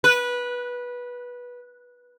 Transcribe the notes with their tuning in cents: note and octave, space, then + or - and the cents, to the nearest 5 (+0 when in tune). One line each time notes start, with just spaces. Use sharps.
B4 -15